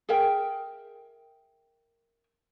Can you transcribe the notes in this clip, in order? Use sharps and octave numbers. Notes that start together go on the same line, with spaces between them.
G#4 A#4 E5 G5